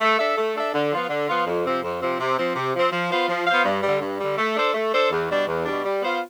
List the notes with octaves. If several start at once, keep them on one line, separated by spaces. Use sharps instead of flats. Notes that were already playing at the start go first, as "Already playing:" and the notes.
A3
D4 A4 E5
A3
D4 A4 E5
D3
F3 B3 F4
D3
F3 B3 F4
F2
C3 F3 C4
F2
C3 F3 C4
C3
F3 C4
C3
F3 C4
F3
B3 F4 C5 F5
F3
B3 F4 C5 F5
G2
D3 G3
G2
D3 G3
A3
D4 A4 C5
A3
D4 A4 C5
E2
B2 G3 D4
E2
B2 G3 D4
G3
B3 F4 C5 F5